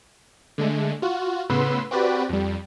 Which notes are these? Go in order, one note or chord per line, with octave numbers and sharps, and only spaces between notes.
D3 G#3 A3
F4 F#4
A2 C#3 B3 B4 C6 E6
C4 F#4 G4 B4 D5
F2 G3